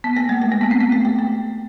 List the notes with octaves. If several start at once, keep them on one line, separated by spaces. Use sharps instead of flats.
B3
A#3
G#3
A3
A#3
B3
C4
B3
A3
A3
A3